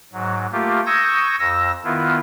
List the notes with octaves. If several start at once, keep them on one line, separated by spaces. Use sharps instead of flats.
G#2 F#3
A3 A#3 F4 G4
C#6 D#6 E6 G6 G#6 A#6
F2 E6 A#6
D#3 B3 E4 F4